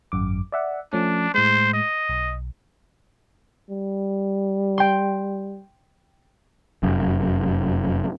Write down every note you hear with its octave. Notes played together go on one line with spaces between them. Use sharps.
G#1 F#2 D6
D5 E5 F#5
F3 A3 C#4 D4
A2 G#3 C5
D#5
B1
G3
G5 C6
F1 F#2